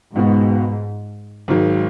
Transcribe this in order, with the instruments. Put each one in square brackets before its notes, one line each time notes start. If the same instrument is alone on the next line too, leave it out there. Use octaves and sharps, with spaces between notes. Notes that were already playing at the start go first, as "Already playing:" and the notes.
[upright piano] C#2 B2 B3 F#4 [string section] G#2
[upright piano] G#1 G#2 D#3 F#3